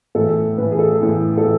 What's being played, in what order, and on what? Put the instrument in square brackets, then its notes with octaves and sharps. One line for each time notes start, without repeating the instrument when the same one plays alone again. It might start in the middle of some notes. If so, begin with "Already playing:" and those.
[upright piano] A2 E3 A4
A2 E3 B4
G#4
A4
A2 E3
A4
E3